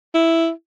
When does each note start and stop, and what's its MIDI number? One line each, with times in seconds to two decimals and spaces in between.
0.14 0.50 64